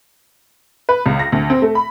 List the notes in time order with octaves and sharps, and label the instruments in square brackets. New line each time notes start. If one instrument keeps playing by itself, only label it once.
[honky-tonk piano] B4
C#2
A#6
D2
C4
A3
B5